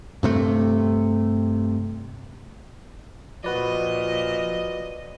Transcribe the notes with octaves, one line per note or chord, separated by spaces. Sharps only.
G2 C3 A3
A#2 F3 F#4 B4 D5 D#5